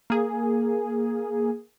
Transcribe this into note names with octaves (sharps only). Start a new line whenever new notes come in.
A#3 G#4